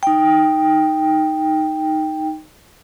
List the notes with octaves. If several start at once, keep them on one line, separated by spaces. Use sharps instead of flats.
D#4 G5